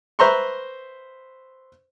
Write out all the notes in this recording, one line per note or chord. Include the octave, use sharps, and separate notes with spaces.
B4 C5 E5 A#5 C6 C#6